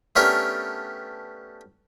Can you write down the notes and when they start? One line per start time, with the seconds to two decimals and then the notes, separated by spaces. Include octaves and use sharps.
0.16 A3 B3 C#4 D4 G4 A#4